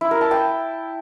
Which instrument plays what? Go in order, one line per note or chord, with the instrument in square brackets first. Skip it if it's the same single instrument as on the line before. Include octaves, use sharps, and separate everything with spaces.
[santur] E4
A#4
A5
G5